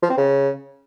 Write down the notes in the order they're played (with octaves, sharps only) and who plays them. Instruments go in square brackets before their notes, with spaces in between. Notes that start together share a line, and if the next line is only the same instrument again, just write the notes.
[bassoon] F3
C4
C#3